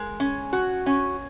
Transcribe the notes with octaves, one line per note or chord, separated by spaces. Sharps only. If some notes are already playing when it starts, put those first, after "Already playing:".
Already playing: G#3 A#4
C#4
F#4
C#4